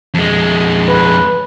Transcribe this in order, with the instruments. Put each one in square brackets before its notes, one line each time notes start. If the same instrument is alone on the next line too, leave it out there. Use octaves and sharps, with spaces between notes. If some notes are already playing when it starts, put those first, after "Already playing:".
[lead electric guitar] F2 G#3
[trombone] B4